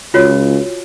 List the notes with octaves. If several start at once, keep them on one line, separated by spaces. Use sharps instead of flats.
C#2 F4 F#4 C#5